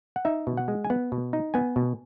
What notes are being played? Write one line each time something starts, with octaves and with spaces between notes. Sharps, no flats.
F#5
D#4 E5
B2
F#5
G#3
G#5
B3 F#5
B2
D#4
B3 G#5
B2